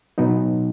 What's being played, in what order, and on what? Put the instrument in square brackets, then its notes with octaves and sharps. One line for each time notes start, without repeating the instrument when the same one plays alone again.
[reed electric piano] B2 F#3 B3 D#4